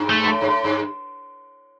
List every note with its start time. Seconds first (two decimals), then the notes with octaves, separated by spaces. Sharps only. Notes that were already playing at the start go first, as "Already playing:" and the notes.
Already playing: G2
0.10 A3
0.23 B2
0.28 A2
0.41 G2
0.46 A2
0.64 G2